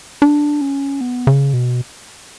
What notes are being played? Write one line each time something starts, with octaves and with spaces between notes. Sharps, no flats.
D4
C#4
B3
C#3
B2